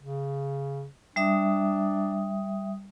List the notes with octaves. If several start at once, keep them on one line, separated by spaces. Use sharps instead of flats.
C#3
G3 D4 E5 D#6